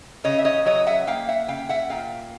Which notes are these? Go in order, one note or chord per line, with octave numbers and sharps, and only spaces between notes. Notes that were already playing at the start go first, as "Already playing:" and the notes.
C#3 C#5 D#5
E5
C#5 D#5
F#3 C#5 D#5
E5 F#5
A#3 F5 G5
E5 F#5
C#3 F5 G5
E5 F#5
A#2 F5 G5